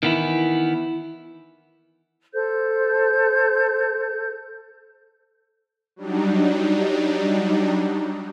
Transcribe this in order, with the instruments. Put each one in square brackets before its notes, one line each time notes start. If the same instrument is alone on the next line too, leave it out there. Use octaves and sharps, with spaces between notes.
[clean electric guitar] D#3 B3 E4 [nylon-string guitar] E3
[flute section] A4 C5 G6
[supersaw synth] F#3 G3 D4 D#4